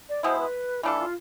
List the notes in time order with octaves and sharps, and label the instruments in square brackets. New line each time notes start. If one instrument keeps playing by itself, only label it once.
[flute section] D5
[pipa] B2 G#3 B3 E4 [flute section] C5
[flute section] B4
[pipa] E3 A3 D4 A4 [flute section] F4
[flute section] E4
F4